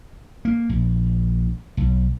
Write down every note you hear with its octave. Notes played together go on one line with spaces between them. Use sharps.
A#3
A#1
B1